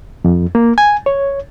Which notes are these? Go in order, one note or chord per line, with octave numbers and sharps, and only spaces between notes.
F2
A#3
G#5
C#5